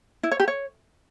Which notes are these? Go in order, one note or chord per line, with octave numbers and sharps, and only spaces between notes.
E4
C#5
G4
C#5